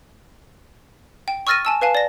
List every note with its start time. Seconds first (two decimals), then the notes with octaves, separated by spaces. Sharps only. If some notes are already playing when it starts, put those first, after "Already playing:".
1.28 G5
1.47 C#6 E6 F6 A6 A#6 D#7
1.65 G#5 A5 E6
1.82 B4 F5 G#5 A5
1.95 D5 A#6